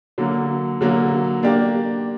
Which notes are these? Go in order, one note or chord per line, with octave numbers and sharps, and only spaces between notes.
D3 F#3 A#3
D3 F#3 A#3
A#3 D4 G4 D5